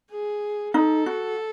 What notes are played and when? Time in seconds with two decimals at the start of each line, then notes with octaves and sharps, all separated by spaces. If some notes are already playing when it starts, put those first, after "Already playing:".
0.11 G#4
0.74 D#4 A4
1.06 F#4